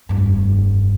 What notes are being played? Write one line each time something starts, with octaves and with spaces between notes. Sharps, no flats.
F1 G2